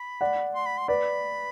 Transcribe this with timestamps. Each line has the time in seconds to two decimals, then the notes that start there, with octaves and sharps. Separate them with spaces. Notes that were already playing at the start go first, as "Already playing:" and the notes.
Already playing: B5
0.21 D5 F#5
0.55 C6
0.66 B5
0.78 C6
0.88 B4 D5 B5